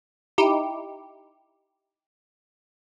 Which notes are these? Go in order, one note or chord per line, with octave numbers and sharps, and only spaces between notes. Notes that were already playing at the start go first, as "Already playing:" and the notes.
D#4 E4 G4